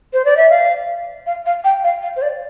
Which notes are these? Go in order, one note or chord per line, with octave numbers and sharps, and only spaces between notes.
C5
D5
E5
F5
F5
F5
G5
F5
F5
C5
D5